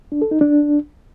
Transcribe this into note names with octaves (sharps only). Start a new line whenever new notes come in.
D4
A4
D#4
D4